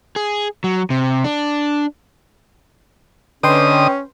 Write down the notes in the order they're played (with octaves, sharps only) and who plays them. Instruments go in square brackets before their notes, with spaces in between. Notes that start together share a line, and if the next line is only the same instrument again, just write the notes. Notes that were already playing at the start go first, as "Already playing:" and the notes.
[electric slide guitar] G#4
F#3
C3
D4
[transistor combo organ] D3 D#5 D#6 [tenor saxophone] C#4 [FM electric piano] B4 G5 C6